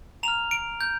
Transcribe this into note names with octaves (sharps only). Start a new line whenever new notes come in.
A#5 F6 F7
D7
G6